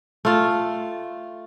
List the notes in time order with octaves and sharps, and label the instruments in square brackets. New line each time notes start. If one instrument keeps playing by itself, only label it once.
[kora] A3 F4